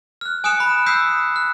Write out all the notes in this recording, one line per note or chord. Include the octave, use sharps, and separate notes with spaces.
F6 F#6
G#5 D#6 F#6 C#7 E7
B5
D#6 E6 G6 B6 C7
F#6